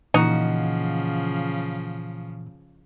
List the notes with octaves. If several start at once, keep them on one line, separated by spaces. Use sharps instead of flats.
A#2 C#3 E3 F3 D#4 F#4